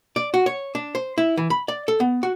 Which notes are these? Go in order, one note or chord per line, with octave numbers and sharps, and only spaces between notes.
D5
F#4
C#5
D4
C5
E4
E3
B5
D5
A4
B3
F#4